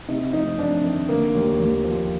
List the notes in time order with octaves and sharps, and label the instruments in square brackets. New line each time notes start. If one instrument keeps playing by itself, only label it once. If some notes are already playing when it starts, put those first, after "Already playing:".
[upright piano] C3 D#4
F2 D#4
F2 D4
D#3
D3 A#3
D#2
D#2
F3